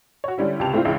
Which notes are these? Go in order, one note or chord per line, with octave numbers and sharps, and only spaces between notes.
F#4 C#5
D3 G3 C#4 E4
C#2 C3 G4 A5 F7
A3 C4 D4 E4 F4
C#2 C#3 E3 G#3 E5 F5